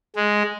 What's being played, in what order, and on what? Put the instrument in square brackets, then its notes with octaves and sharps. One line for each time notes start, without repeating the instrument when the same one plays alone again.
[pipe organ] G#3